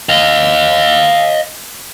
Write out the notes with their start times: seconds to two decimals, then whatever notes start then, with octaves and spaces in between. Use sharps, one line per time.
0.09 D#5 F5